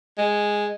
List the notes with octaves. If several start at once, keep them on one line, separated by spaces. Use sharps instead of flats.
G#3